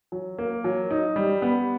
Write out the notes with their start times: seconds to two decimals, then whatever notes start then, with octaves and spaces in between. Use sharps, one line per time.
0.12 F#3
0.38 A#3
0.64 F#3
0.90 D#4
1.16 G3
1.42 B3